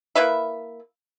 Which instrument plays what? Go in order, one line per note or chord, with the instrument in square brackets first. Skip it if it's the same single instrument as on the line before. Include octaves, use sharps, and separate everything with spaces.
[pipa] A#3 E4 B4 E5